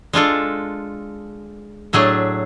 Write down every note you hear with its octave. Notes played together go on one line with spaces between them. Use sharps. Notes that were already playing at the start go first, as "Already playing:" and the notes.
G#3 D4 F4 A4
A2 F#3 A3 D4 G#4